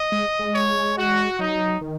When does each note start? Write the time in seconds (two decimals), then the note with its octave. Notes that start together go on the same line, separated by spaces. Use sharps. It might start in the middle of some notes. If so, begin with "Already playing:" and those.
Already playing: D#5
0.12 G#3
0.39 G#3
0.54 C#5
0.97 F#4
1.39 F#3 D#4
1.81 D#3